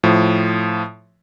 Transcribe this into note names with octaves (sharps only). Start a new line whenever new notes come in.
A2 F3